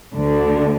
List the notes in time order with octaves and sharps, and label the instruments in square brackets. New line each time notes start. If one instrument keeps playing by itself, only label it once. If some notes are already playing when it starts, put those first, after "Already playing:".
[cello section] D2 D3